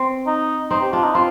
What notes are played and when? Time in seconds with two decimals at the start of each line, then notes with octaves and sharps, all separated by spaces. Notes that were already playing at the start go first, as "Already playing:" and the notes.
Already playing: C4
0.27 D#4
0.71 C4 D#4
0.82 G4
0.92 D4 F4
1.04 D#4
1.15 C4 F4